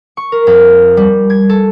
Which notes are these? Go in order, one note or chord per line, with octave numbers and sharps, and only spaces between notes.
C#6
A#4
F2
G3
G#6
A4